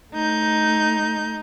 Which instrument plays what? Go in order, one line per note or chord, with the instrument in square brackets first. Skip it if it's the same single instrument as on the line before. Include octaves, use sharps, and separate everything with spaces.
[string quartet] A3 G6 [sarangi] D#4